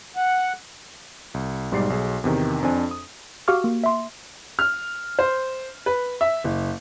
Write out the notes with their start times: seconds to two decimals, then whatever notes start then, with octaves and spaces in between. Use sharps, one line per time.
0.17 F#5
1.34 C2
1.71 B1 G#2 G3 D5 C7
1.90 B1 G#4
2.24 E2 C3 D#3
2.62 F2 C4 D4 G#5
2.91 D#6
3.48 F#4 G4 F5 C#6 D6 F6
3.64 A#3
3.84 E5 C6
4.59 F6
5.19 C5
5.86 B4
6.21 E5
6.44 F#1